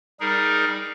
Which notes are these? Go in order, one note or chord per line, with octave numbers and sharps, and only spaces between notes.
G3 D#4 G#4 A#4